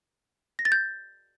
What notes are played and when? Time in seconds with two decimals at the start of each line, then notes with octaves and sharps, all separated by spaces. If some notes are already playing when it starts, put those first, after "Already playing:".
0.59 A#6
0.65 A6
0.72 G6